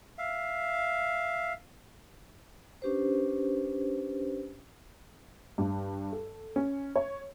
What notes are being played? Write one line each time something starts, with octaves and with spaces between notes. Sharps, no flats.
E5 F5
C#4 D4 G4 B4 C5
G2
A4
C#4
C#5